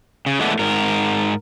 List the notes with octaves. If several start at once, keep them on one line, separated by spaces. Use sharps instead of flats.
C#3
E3 G#3 A3 B3 D4
G#2 A#4